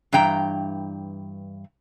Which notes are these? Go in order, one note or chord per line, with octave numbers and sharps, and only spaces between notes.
G2 E3 G5 A#5